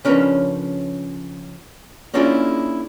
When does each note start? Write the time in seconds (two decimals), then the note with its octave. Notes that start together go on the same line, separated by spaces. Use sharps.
0.05 C#3 F3 C#4 D4 A#4 B4
2.14 A#3 C#4 D4 E4 F4 G#4